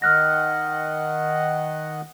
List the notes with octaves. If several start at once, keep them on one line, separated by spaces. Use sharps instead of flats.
D#3 D#5 F#5 F6 F#6 A#6